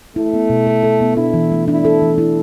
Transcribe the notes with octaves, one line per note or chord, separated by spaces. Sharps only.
A3 E4
B3
B2
A4
A4
B3
D4 E4
E3
A3
D4 E4
A4
E3
E4